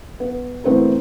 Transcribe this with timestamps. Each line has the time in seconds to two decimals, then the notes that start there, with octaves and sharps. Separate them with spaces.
0.20 B3
0.64 E3 A3 B3 C4 E4 A#4